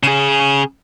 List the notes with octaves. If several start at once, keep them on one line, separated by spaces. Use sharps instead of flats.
C#3 G#4